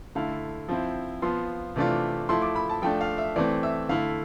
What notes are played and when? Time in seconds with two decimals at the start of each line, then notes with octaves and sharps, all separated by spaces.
0.15 D3 A3 E4 F5
0.69 F3 C4 E4
1.22 F3 B3 F4 C6
1.76 C3 E3 A3 D4 F4
2.29 F3 A3 E4 C6
2.42 D6
2.56 B5
2.69 A5
2.82 F3 A3 D4 G5
3.01 F5
3.18 E5
3.36 E3 A3 C4 D5
3.63 E5
3.89 D3 A3 E4 F5